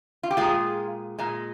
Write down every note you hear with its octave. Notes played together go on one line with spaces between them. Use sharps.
F4
G4
A#2 G#3 F4 G#4
A#2 G#3